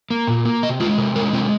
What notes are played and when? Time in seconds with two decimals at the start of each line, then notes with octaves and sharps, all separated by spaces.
0.10 A#3
0.27 A#2
0.45 A#3
0.63 C3 D#5
0.80 G#3 F4
0.98 C3
1.16 G#3 A#4
1.33 C3 C4